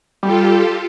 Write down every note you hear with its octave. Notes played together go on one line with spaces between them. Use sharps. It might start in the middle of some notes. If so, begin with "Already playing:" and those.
G3 F4 G4 A4